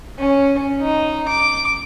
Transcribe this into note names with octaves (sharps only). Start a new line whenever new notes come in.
C#4
D#4
D6